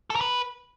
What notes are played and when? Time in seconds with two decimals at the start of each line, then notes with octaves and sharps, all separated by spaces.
0.10 A4
0.15 A#4
0.21 B4